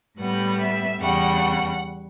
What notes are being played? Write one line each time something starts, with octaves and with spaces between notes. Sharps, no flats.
A2 G3 B3 F#5
E5
E2 C#3 G3 F#5